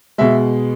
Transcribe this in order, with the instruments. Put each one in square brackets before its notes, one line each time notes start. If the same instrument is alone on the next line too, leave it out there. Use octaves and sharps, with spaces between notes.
[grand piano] B2 G#3 E5